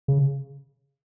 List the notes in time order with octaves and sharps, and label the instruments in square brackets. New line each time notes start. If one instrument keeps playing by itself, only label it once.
[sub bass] C#3